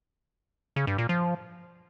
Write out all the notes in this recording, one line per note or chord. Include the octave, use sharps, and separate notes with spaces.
C#3
G2
A#2
F3